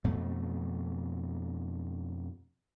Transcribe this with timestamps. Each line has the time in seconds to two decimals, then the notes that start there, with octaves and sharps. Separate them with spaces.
0.04 F2 B2 A3